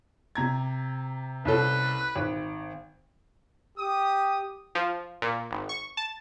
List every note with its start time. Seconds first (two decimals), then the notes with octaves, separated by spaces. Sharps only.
0.35 C3 A#5 G#6
1.45 C2 C#4 A4 B4
2.16 G#1
3.78 G4 D#6
4.75 F3
5.22 A#2
5.51 G#1
5.69 C#6
5.97 A5